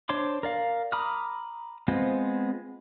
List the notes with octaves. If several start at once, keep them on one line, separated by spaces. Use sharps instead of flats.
D4 C5 C#5 C6 D6
A#4 D5 F5
A#5 B5 D6 D#6 F6
G#3 B3 C4 F4 C5